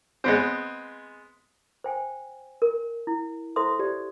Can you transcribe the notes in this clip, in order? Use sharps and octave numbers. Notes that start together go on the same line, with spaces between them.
G#3 B3 C4
C5 G5 G#5
A#4
E4
E4 A4 C5 E5 C6 D#6
G4 C5 D5